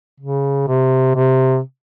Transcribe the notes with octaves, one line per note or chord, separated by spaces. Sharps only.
C#3
C3
C3